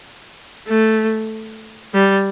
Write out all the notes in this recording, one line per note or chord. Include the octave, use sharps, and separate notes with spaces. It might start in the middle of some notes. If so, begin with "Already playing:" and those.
A3
G3